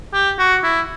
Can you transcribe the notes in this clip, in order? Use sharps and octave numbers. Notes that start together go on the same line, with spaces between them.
G4
F#4
E4